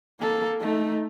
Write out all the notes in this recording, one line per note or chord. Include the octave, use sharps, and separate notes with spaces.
A#3 A4
A3 D#4